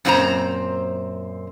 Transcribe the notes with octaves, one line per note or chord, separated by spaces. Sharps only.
F#2 A#2 C4 F4 C5 A#5